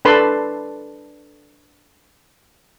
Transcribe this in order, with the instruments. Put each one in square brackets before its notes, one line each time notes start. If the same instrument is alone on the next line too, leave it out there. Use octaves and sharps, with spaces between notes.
[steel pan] D4 A4 B4 A5 B5 C6